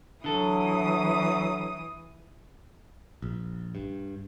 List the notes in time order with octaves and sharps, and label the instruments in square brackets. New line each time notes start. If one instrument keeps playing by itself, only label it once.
[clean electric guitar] D3 A4 [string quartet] E3 D#6 [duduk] F#3
[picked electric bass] A#1
G2